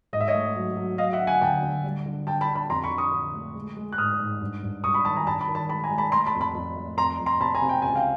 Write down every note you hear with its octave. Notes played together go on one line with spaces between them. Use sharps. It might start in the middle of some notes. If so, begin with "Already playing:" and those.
G#2 D#5
E5
C#5 D#5
A3
F#3
F#3
F#3 D#5 F5
E5 F#5
D3
F#5 G#5
D2 G5 A5
D2
G3
D3
D3 G5 A5
A5 B5
D3
A5 B5
F2 A#5 C6
B5 C#6
D3
C#6 D#6
D3
A3
G#3
G#3
F#6
G#2 D#6 F6
G#2
G2
G2
G2 C#6 D#6
B5 C#6
D#3 A5 B5
G#5 A#5
G2 A5 B5
A5 B5
D#3
A5 B5
G#3 A5 B5
G#5 A#5
G#3
A5 B5
A3 A#5 C6
A5 B5
F2
A5 B5
F2
A3
F2 A#5 C6
F2
A#5 C6
C3 A5 B5
G#5 A#5
C3
G5
C#2 G#5
F5 G5